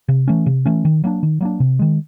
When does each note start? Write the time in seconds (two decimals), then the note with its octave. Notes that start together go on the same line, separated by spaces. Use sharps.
0.08 C3
0.28 E3 A3 C#4
0.46 C3
0.66 E3 A3 C#4
0.85 D#3
1.04 F#3 A#3 D4
1.23 D#3
1.41 F#3 A#3 D4
1.60 C3
1.79 D#3 G#3